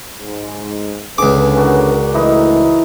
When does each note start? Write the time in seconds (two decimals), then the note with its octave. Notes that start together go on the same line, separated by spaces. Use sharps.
0.19 G#2
1.18 C#2 D3 C#4 G#4 B4 D6
1.57 F#4 A#4 D5
2.14 D2 E3 A3 D#4